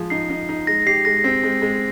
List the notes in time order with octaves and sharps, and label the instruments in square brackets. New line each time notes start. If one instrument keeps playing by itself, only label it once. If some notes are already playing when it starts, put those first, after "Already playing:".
Already playing: [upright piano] F3 G#3 G#4
[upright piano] D#4 [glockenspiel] C7
[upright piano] D#4
D#4
[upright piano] G#3 [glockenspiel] A#6
[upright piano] G4 [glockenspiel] C7
[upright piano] G#3 [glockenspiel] A#6
[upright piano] C4 [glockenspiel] C7
[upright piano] G#3
G#3